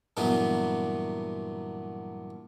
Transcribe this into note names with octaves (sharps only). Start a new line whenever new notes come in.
G2 A#2 E3 F#3 B3